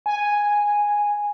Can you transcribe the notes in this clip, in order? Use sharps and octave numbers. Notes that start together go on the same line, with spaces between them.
G#5